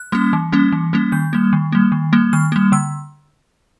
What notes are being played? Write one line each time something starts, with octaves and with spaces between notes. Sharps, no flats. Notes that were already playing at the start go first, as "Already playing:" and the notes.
Already playing: F#6
G3 A#3 C#4
E3
G3 A#3 C#4
E3
G3 A#3 C#4
D#3 G6
G3 A#3
D#3
G3 A#3
D#3
G3 A#3
D#3 F6
G3 A#3
D3 E6